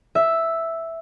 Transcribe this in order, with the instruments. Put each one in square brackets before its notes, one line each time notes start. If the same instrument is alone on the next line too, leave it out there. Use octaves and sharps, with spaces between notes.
[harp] E5